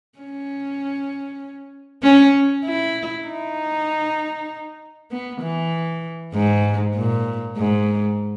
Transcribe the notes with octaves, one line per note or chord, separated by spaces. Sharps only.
C#4
C#4
E4
D#4
B3
E3
G#2
A#2
G#2